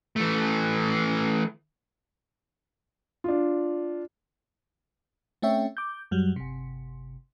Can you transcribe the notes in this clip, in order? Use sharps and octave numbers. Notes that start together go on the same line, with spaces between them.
E3 A3
D4 F4
A3 C4 C#4 C#5 E5 G5
D6 G6
F#2 F#3 G3
G1 C3